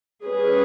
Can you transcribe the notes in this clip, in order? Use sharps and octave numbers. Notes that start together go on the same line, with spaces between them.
G3 C#4 G#4 B4